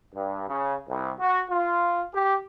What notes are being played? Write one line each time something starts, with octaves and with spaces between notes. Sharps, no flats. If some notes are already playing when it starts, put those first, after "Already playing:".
G2
C#3
C2
F#4
F4
G4